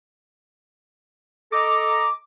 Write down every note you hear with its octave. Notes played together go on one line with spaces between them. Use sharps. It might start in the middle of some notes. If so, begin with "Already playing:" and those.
A4 D#5 A#5 D6